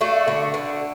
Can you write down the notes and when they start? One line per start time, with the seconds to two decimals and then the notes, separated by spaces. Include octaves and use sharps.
0.01 A3 D4 F#4
0.28 D3
0.54 D3